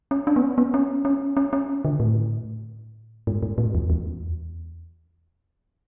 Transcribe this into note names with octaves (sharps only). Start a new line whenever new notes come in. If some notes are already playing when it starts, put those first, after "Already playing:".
C#4
D4
B3
C#4
B3
C#4
C#4
C#4
C#4
D3
A2
G#2
G#2
A2
E2
E2